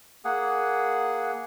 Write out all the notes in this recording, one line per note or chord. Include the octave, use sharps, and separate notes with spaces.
A#3 G#4 F#5